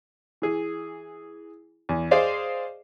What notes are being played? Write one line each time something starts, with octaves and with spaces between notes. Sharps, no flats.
E3 G#4
E2
G#4 C5 D5 D#5 F5